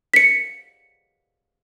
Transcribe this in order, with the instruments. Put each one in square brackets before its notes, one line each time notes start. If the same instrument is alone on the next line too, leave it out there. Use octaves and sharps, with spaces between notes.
[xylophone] B6 C#7